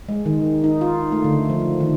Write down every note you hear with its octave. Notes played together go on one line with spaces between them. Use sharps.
G#3
D#3
D#4
F4
A3
D3
F3
D#3